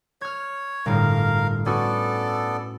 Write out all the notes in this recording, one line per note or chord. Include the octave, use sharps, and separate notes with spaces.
C#5 F6 G#6
G1 A2 A#4 F5
B3 C#4 F#4 A4 D5